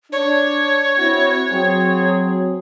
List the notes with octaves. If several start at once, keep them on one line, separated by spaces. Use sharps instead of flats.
D4 C#5
C4 E4 F#4
F#3 C4 G#4